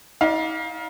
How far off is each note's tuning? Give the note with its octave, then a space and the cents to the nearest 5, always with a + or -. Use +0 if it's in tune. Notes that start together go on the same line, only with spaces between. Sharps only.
D#4 +40 D5 +0 F5 +15